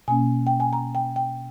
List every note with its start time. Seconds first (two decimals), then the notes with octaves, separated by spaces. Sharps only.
0.08 B2 A#3 C#4 G#5
0.47 G5
0.60 G#5
0.73 A#5
0.95 G5
1.16 G5